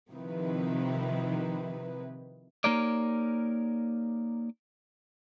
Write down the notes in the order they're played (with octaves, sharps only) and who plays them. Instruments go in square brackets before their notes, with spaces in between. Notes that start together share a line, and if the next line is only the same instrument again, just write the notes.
[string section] C3 D#3 F3 D#4 E4 B4
[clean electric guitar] A#3 D#4 G4 A#4 C#5 D5